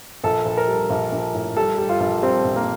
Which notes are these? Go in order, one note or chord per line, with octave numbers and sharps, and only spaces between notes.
A#1 A4
A#1
A#4
G3
A#1
A#1
A2
G3 A4
G3
F4
A#1
G3 C4
A#1
A#3